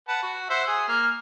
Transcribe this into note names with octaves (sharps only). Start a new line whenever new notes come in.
B4 F#5 A5
F#4
C5 E5 F#5
G#4
A#3 F6